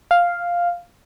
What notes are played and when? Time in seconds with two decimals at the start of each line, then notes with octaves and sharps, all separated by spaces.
0.11 F5